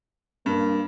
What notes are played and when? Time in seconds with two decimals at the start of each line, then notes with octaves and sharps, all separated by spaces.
0.46 G2 A#3